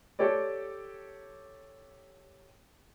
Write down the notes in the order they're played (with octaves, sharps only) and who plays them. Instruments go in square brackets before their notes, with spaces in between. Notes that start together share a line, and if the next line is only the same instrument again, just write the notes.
[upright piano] G4 A4 C#5 D5